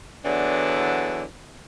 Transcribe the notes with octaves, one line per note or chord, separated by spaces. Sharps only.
E2 D3 E3 F#3 D4